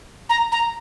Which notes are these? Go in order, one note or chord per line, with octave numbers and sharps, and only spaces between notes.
A#5
A#5